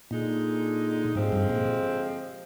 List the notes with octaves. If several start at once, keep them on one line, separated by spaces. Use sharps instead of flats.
A#2 D3 G#3 D#4
G#2 D3 F3 G#3 C4 G4
G2
A#2